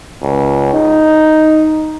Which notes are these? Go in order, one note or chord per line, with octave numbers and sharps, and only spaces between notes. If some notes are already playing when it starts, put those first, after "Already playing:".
C#2
D#4